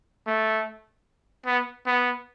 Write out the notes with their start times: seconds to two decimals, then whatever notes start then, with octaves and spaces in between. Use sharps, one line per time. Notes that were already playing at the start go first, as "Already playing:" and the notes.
0.27 A3
1.46 B3
1.86 B3